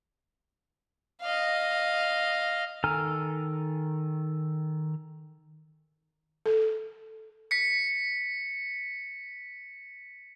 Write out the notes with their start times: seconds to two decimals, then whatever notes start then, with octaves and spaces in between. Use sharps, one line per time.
1.22 D#5 F5
2.84 D#3 A4 G#5 A#5 F6
6.46 A4
7.51 B6 C#7